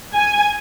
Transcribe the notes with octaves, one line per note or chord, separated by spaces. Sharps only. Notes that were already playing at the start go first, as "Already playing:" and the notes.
G#5